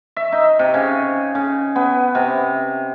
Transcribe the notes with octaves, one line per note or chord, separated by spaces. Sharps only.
E5
D#4
C3
C#3
C#3
B3
C3